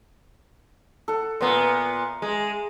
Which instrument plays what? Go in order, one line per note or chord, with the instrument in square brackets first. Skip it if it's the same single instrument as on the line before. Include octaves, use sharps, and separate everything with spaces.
[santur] A4 F#5
[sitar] A#2 B3 [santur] E5 A#5 C6
[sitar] G#3